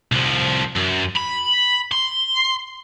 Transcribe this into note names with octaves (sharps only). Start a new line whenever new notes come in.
C2 F3
F#2
B5
C6